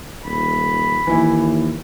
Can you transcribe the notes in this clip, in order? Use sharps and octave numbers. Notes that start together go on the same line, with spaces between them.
D#1 B5
D#2 E3 E4